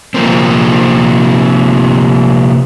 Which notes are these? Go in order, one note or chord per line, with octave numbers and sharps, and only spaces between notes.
C3 F3 A#3 C4